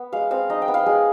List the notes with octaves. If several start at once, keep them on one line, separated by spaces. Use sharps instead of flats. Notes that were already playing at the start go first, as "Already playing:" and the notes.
Already playing: B3
G#3 F5
C4 F5
D#4 D#5
G5
B3
F5
G#3 G#4